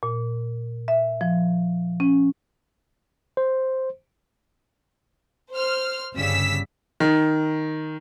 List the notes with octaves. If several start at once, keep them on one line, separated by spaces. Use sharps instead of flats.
A#2
E5
F3
C#4
C5
C5 F6
G1 C#3 G3 E6 B6
D#3